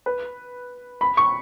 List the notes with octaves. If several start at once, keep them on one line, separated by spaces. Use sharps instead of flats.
B4
B5
C#6